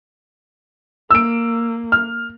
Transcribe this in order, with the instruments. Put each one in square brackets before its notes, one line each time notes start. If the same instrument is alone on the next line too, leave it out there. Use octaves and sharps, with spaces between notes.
[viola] A#3 [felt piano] E6 D7
[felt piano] F6